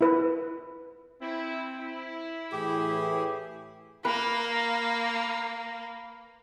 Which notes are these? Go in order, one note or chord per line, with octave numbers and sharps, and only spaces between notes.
E4 B4
C4 E4
E4
A2 E3 G4 G#4
A#3 B4